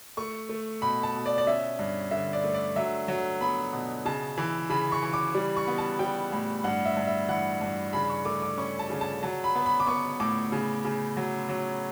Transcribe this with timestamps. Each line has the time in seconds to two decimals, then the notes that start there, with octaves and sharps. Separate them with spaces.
0.17 A3 C#6
0.49 A3
0.82 B2 B5
1.03 A5
1.15 B2
1.26 D5
1.38 D5
1.47 C#4 E5
1.79 G2
2.11 D3 E5
2.33 D5
2.44 A3
2.54 D5
2.76 F#3 E5
3.08 F#3
3.41 B3 B5
3.73 B2
4.05 C#3 A5
4.38 E3
4.70 C#3 B5
4.92 C#6
5.03 E3
5.13 D6
5.35 G3
5.56 C#6
5.68 B3
5.78 A5
5.99 G3 G5
6.32 A2
6.64 G2 F#5
6.85 E5
6.97 G2
7.07 E5
7.29 E3 F#5
7.61 G2
7.93 C#3 B5
8.09 C#6
8.25 A3 D6
8.42 D6
8.58 C#4 C#6
8.79 A5
8.90 C#3
9.01 A5
9.23 F#3 A5
9.44 B5
9.55 B3
9.66 B5
9.80 D6
9.87 B3 C#6
10.20 A2 D6
10.52 C#3
10.85 C#3
11.17 F#3
11.49 F#3